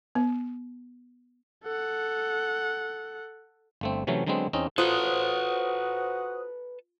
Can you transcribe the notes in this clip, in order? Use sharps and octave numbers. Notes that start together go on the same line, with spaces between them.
B3
A4 F#5
G1 A3 C4
C3 E3 F#3 A3 C#4
D3 F#3 G#3 B3 C4
E2 C4 C#4 D#4 D#5
F4 F#4 A4 B4 C5 D#6 F#6